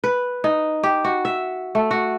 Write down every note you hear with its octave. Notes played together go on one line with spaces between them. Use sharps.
B4
D#4
G4
F#4
E5
A3
F#4